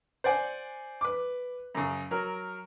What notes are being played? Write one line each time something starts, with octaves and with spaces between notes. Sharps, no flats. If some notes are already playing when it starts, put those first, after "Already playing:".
C5 D5 F#5 G#5
B4 D6
F#2 C#3
F#3 A#4